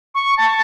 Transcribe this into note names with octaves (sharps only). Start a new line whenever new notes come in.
C#6
A5